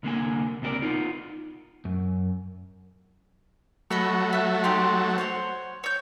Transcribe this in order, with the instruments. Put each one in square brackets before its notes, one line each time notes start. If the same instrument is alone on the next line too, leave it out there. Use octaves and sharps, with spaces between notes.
[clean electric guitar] C2 D3 A#3 G#5
C#2 C3 D4 G4 A#4 D5
B3 D#4 F4
[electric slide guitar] F#2
[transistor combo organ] F#3 A3 [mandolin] D#5 B5 C#6
[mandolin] E5 F#6
D#4 G4 C6
C5 C#5 F#5
C#5 G6